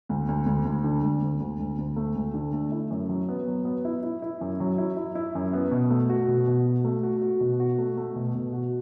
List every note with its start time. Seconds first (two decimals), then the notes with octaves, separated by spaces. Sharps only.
0.09 D2
0.28 D2
0.46 D2
0.65 D2
0.84 D3
1.02 D2
1.22 D2
1.40 D2
1.59 D2
1.78 D2
1.96 A3
2.15 D2
2.34 D3
2.53 A3
2.71 E4
2.91 F#2
3.09 F#3
3.29 B3
3.47 F#3
3.65 B3
3.85 E4
4.03 E4
4.22 E4
4.41 F#2
4.60 F#3
4.78 E4
4.97 E4
5.15 E4
5.35 F#2
5.53 B3
5.71 B2
5.90 A3
6.10 F#4
6.28 B2
6.48 B2
6.66 F#4
6.84 A3
7.03 F#4
7.22 F#4
7.40 B2
7.60 F#4
7.78 A3
7.97 A3
8.16 B2
8.35 B2
8.53 F#4